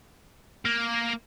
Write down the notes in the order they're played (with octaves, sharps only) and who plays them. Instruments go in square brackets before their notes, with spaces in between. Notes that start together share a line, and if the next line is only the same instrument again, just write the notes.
[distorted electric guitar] A#3